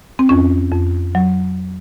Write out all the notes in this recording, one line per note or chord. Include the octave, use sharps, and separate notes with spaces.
C4
F2 C#4
F2
F#3